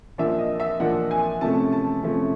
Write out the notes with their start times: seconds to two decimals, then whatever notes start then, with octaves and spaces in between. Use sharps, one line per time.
0.18 A#2 F3 A#3 D4 E5
0.39 D#5
0.60 E5
0.80 A#2 F3 A#3 D4 F#5
1.11 G#5
1.41 C3 F3 A3 C#4 A5
1.72 A5
2.03 C3 F3 A3 C#4